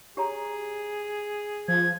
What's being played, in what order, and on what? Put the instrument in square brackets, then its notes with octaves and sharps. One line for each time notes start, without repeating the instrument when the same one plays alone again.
[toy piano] G4 C#5 A#5 [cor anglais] G#4
[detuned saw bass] F3 [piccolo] G#6